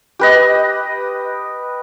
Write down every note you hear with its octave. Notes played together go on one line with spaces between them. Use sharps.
G4 B4 D#5